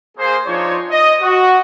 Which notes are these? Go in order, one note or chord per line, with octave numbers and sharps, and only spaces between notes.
A#3 G#4 C5
F3 D4 D#4 F4 C5 C#5
D#5
F#4